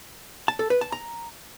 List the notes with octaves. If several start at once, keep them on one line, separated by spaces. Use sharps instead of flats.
A5
A4
B4
A5
A#5